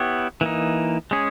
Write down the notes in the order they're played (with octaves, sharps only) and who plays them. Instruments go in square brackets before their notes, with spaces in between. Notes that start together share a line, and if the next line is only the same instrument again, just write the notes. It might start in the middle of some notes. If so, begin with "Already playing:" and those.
Already playing: [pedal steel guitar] B3 E4 G4 C#5
E3 A#3 D#4
G#3 C#4 G#4